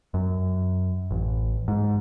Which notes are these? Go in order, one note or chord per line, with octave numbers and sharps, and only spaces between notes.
F#2
A1
G#2